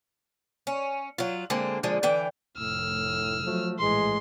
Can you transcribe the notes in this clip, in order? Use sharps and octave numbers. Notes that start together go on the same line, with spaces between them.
C#4
F#3 F4
D3 G#3 A#3 C4
A#2 D3 F3 G#3
D3 E3 G5
F1 A2 E6 F6
F3 F#3 A3
A#1 A2 E3 G#3 C6